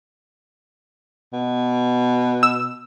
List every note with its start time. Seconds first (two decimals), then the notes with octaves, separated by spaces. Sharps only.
1.33 B2
2.43 E6